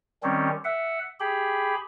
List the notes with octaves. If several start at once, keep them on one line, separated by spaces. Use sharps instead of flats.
D#3 G3 C4 C#4
E5 F#5
G4 G#4 B5